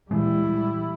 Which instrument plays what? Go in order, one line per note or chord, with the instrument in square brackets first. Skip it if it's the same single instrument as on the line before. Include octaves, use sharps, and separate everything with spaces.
[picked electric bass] A#2 E3 G#3 [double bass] G3 E4